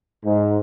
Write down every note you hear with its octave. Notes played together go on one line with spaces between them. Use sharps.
G#2